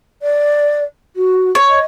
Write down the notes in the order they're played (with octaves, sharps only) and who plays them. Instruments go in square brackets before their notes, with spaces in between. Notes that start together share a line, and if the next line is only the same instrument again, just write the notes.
[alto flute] D5
F#4
[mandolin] C#5
[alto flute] D#5